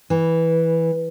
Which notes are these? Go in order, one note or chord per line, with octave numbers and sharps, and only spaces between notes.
E3